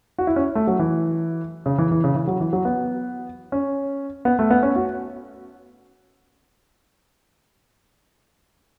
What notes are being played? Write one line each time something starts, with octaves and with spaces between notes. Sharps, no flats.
F#4
E4
C#4
A3
F#3
E3
C#3
E3
E3
C#3
E3
F#3
E3
F#3
B3
C#4
B3
A3
B3
C#4
F#4